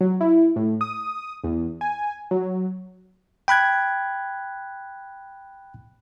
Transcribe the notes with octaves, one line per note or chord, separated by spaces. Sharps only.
F#3
E4
A2
D#6
E2
G#5
F#3
G5 B5 F#6 G#6